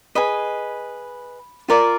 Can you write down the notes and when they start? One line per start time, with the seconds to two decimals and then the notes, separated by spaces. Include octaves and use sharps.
0.15 G#4 B4 D#5 B5
1.68 F4 A#4 D5